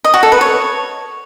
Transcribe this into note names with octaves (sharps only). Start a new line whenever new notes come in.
D#5
F#4
A4
B4
C#5